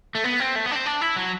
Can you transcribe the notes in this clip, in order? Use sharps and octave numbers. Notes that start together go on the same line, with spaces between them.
A3
B3
C4
A3
B3
D4
C4
D4
E4
F#3